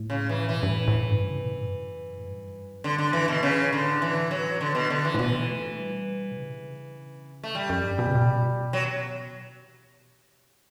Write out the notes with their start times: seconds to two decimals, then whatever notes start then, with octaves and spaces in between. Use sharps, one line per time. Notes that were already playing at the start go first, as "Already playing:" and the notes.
Already playing: A2
0.10 C#3
0.29 E3
0.49 B2 E3
0.63 G2
0.68 A2
0.88 A2
1.08 G2
1.30 C#3
1.39 B2
1.48 A2
1.57 G2
1.66 F#2
2.18 A2
2.25 G2
2.73 F#2
2.84 G2 D3
2.98 D3
3.13 E3
3.28 B2
3.43 A2 C#3
3.72 D3
4.02 E3
4.31 F#3
4.61 D3
4.75 B2
4.90 D3
5.05 E3
5.14 A2
5.19 B2 E3
5.49 A3
5.78 G3
6.32 B2
6.37 C#3
7.43 A3
7.55 A2 G3
7.70 F#2
7.84 G2
7.99 B2
8.07 C#3
8.15 B2
8.73 F#3